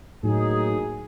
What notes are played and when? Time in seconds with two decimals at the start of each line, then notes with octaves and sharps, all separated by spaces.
0.23 A2 F#3 A#3 D#4 G#4